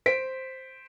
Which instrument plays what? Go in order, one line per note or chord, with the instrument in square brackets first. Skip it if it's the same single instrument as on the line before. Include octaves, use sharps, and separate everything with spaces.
[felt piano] C5 B6 D7